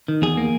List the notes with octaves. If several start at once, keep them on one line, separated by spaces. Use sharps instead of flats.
D#3
E2 G#4
A#3